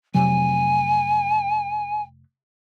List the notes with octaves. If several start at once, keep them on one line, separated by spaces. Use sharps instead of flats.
F1 C3 F#3 G#5